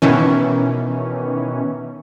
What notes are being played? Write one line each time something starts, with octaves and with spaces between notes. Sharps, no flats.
B2 D#3 E3 C#4